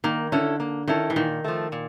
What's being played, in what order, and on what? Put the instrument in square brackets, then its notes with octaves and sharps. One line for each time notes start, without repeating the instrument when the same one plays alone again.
[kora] D#3 [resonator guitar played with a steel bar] A#3
[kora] D3 [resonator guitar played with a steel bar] C#4 E4 A4
[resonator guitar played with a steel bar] A#3
[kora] D#3 [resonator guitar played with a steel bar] C#4 E4 A4
[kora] E3
[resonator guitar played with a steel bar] A#2 [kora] D#3
[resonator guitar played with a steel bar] F3 A3
A#2